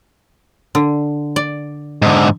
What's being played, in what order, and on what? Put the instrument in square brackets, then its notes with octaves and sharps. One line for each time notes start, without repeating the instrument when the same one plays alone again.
[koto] D3
D5
[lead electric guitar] G#2 D3